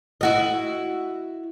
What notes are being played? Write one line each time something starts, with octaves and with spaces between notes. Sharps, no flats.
E4 F#4 D#5